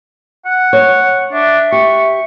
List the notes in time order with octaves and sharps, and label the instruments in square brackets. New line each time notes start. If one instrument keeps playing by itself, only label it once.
[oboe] F#5
[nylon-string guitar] C#5
[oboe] D4 [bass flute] E5
[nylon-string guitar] G4 [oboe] C#6